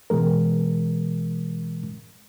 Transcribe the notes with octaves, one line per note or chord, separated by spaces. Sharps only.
B2 E3 G#3 A#4